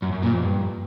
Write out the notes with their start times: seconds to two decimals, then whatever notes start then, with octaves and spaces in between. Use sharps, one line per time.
0.02 F#2
0.12 F#2
0.23 A#2
0.33 F2
0.43 G2